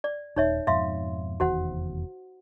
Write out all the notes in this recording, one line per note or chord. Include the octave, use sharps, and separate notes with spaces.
D5
D#1 D#4 C#5 E5
F2 G#2 B2 E5 F5 C6
F1 E2 D#3 F#4 C5 F#5